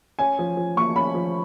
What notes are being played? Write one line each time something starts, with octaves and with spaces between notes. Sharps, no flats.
C#4 G#5
F3
F3
A#3 C#6
C#4 B5
F3